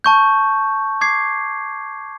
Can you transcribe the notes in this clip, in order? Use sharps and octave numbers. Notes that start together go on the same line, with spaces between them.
A5 C#6 G6
D6 G#6 C7